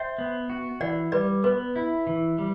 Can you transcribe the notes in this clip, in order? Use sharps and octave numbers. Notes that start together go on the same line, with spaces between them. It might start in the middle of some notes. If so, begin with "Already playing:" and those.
Already playing: C5 E5 G5
B3
F#4
E3 D5 F#5
G3 B4 D5
B3 B4
E4
E3
G3